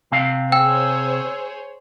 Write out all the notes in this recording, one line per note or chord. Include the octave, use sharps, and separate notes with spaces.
C3 C4 F5
G#4 C5 C#5 G5 E6